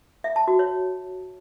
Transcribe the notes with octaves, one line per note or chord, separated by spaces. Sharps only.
E5
A5
F#4
C#5